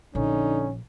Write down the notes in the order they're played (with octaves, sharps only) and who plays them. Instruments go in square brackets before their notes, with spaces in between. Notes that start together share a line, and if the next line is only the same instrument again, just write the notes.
[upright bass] A#1 [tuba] D3 [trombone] C#4 [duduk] D#4